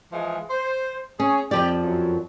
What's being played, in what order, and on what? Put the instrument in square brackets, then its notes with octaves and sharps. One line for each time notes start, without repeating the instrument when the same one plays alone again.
[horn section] E3 F3 G#3
C5
[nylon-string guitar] C#4 [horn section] G#4 C#5
[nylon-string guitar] F2 F3 D5 [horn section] G4
[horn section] F#2 F#3